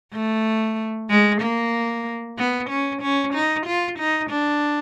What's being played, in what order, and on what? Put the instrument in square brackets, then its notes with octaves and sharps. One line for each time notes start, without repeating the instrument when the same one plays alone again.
[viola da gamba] A3
G#3
A#3
B3
C#4
C#4
D#4
F4
D#4
D4